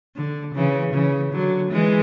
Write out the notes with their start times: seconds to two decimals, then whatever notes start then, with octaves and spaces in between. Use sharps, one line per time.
0.16 D3
0.55 C#3 E3
0.94 C#3 E3
1.32 D3 F#3
1.72 E3 G#3